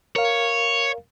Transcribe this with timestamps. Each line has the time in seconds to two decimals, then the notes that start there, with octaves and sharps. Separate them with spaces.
0.16 A#4 C#5 F5